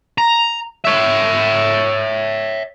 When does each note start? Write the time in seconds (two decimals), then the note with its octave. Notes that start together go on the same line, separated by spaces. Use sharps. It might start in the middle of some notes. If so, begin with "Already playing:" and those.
0.18 A#5
0.84 C#5 E5